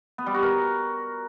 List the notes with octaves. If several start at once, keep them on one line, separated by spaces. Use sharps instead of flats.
B3
G3
F#4
A#4